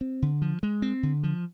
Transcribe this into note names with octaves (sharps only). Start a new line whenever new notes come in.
C4
D3
F3
G#3
C4
D3
F3